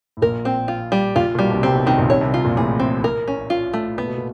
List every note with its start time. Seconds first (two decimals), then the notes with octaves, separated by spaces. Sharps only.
0.17 A2
0.22 A#1 A#2 A#4
0.45 C4
0.68 F4
0.92 G3
1.16 A#1 A#2 F4
1.35 A#2
1.39 B1 B2 G3
1.51 C2 C3
1.63 C2 C3 C4
1.75 B1 B2
1.86 C2 C3 D#3
1.98 A#1 A#2
2.10 C2 C3 C#5
2.21 C2 C3
2.34 F4
2.45 A#1 A#2
2.56 A1 A2 G#4
2.80 C4
3.04 A#4
3.28 C#4
3.50 F4
3.74 A3
3.97 A#2 B3
4.07 B2
4.18 A#2